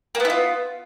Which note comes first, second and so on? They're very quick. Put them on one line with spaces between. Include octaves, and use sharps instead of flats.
A#3 B3 E4 F4